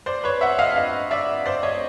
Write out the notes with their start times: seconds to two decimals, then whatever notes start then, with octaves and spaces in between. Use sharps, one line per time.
0.06 C5 D5
0.24 B4 C#5
0.41 E5 F#5
0.59 D#5 F5
0.76 D#5 F5
1.11 D5 E5
1.46 C5 D5
1.63 C#5 D#5